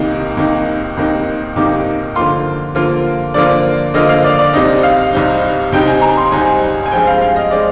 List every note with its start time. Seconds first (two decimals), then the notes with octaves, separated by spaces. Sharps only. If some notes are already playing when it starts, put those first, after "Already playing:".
Already playing: C2 C3 D#3 A#3 D#4
0.37 C2 C3 D#3 A#3 D#4
0.97 C2 C3 D#3 A#3 D#4
1.56 C2 C3 D#3 A#3 D#4 D6
2.16 D3 F3 A#3 F4 C6
2.75 D3 F3 A#3 F4
3.34 D3 F3 A#3 F4 D5
3.94 D3 F3 A#3 F4 D#5
4.09 F5
4.24 D5
4.39 D5
4.54 C2 C3 G3 C4 D#4 D#5
4.83 F5
5.13 C2 C3 G3 C4 D#4
5.72 C2 C3 G3 C4 D#4 G5
5.87 G#5
6.02 A#5
6.17 C6
6.32 C2 C3 G3 C4 D#4 G#5
6.86 G#5
6.91 G2 F3 G#3 C4 G5
7.07 F5
7.21 F5
7.36 D#5
7.51 F3 G#3 C4 D5